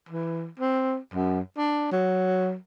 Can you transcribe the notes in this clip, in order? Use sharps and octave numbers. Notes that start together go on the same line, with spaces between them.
E3
C4
F#2
D4
F#3